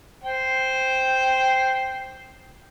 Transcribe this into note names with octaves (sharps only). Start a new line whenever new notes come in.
C5 G5